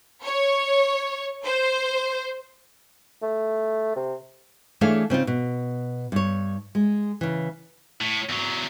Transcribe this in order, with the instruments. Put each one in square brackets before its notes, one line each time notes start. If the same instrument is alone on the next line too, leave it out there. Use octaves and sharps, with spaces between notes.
[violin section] C#5
C5
[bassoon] A3
C3
[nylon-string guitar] E3 A3 D4 G#4 C#5 F5
C#3 C4 D#4 F4
B2
G2 C#5
G#3
C#3 E3
[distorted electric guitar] A2
E2 F#3